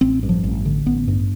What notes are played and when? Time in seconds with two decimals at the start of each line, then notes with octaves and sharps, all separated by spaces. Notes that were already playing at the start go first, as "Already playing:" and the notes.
0.01 A1 C4
0.23 G2
0.29 F3
0.44 A1
0.65 D3
0.86 A1 B3
1.08 G2